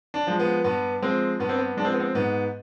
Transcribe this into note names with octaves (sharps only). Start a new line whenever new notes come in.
D4
F3 G#3
B3
G2 B3
F3 G#3 C4
G2 B3
C4
B3
F3 G#3 C4 D4
B3
C4
G#2 B3